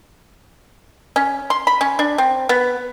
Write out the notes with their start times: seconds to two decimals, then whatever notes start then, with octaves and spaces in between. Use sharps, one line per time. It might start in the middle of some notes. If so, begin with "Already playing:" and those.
1.16 C#4
1.50 C6
1.67 B5
1.81 C#4
1.99 D4
2.18 C4
2.49 B3